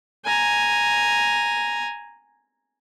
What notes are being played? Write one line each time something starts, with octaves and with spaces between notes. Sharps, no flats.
G#5 A#5